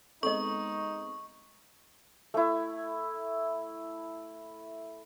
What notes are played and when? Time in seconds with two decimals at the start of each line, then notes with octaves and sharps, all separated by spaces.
0.23 G#3 B3 C4 D#4 A4 D#5 C#6
2.34 A3 E4